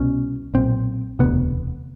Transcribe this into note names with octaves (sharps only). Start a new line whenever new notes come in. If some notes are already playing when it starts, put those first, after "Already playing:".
Already playing: C2 B2 C#4
B1 A#2 C4
E1 D2 C3 B3